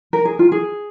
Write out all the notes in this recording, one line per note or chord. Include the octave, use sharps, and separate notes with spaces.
A#4
G#4
F4
G#4